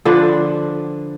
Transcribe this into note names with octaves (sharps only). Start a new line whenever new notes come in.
D3 F3 D4 B4